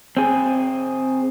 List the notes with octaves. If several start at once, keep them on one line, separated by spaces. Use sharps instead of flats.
C4 G#4